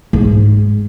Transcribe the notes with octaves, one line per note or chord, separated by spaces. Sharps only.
G#2